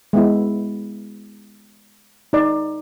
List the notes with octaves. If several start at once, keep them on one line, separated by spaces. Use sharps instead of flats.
G#3 B3 E4
D#4 D5